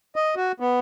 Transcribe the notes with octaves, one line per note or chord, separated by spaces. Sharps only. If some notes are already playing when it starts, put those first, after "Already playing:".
D#5
F#4
B3